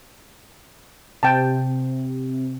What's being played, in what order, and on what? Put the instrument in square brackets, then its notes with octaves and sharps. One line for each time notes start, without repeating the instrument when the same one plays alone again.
[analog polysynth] C3 [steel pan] G5 A5